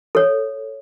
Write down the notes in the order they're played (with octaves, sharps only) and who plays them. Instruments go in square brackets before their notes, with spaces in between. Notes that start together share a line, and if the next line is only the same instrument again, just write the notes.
[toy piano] A4 C#5